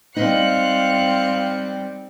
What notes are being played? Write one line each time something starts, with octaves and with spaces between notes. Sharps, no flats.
G3 C4 D#4 F5 F#6 C#7